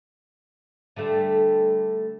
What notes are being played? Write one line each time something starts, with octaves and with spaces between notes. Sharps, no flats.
D3 G3 A3